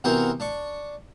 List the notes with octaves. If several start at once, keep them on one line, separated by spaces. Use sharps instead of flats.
C3 E3 B3 F#4 A#4 C5
D4 C#6